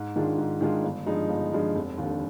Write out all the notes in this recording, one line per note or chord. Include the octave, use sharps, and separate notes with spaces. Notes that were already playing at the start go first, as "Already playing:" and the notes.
Already playing: G#2
D#3 G#3 D4 F4
G#2
D#3 G#3 D4 F4
G1
G2 F3 G#3 D#4
G1
G2 F3 G#3 D#4
F1
D#2
D3